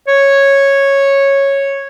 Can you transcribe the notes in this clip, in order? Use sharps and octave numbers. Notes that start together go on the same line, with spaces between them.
C#5